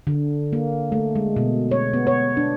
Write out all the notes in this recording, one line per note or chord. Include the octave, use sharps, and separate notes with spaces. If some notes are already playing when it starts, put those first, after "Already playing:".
D3
A#3
A3
G#3
B2
C#5
B3
C#5
D4